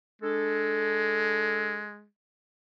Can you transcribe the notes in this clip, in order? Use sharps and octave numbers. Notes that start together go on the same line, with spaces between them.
G#3 D4 A4